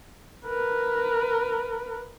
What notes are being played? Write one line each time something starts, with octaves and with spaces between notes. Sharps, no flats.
A#4 B4